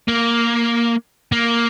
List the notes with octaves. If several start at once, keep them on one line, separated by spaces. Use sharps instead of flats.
A#3
A#3